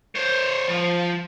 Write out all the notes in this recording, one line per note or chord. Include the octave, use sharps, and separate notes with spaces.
C5 C#5
F3